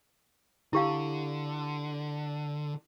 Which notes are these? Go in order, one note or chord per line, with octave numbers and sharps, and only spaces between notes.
D3 E4 G4 F5